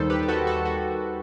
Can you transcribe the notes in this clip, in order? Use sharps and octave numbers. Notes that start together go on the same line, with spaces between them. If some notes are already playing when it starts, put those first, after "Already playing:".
Already playing: D#2 D#3 G3 D#4 A4 C5
G4 B4
G4
F#4 A4
F#4 A4
F#4